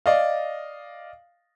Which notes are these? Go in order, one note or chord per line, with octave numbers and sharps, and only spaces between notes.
D5 D#5 F5